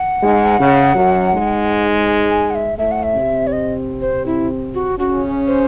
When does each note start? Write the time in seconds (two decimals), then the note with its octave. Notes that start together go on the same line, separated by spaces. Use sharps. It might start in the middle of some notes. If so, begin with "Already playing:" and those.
Already playing: F#5
0.23 G#2 G#3
0.59 C#3
0.95 F#2 F#3
1.32 G#2 G#3
2.06 G#5
2.30 G#5
2.50 F#5
2.55 E5
2.78 A2 A3 E5
2.91 F#5
3.03 E5
3.15 C3 C4
3.47 C#5
3.52 D#5
4.01 C5
4.26 E4
4.74 F#4
4.98 C#3 C#4 F#4
5.47 C5